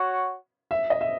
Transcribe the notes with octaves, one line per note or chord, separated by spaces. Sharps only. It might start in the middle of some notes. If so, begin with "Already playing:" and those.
Already playing: F#4 C#5 F#5
E5
D#5
E5